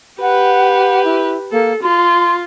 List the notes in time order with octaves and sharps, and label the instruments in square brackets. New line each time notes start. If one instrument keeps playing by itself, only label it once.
[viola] G4 B4 [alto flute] F#5
[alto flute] E4
[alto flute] A#3 [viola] A4
[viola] F4 [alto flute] C6